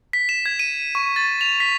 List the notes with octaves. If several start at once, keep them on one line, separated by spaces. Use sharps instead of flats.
B6
E7
G#6
D#7
C#6
A6
F7
B6